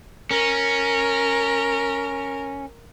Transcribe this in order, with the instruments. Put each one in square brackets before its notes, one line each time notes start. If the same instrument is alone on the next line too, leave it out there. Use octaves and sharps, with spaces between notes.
[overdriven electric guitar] C#4 [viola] A#4